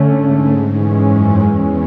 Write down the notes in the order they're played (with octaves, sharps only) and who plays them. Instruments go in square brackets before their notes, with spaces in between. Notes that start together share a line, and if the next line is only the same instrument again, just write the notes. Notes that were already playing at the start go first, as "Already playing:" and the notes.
Already playing: [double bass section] D3 A3 C#4
[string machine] G#2
[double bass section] E3 G#3 C#4
[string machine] F#2
E2